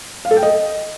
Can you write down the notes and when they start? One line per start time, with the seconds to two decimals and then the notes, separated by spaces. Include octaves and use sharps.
0.25 F5
0.31 A4
0.37 G5
0.43 D#5